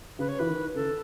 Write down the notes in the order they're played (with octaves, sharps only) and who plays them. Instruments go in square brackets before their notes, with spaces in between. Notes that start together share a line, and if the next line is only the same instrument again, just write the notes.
[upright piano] C#3 [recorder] B4
[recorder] C#5
[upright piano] E3 [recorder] B4
[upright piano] D#3
[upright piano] C#3 [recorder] A4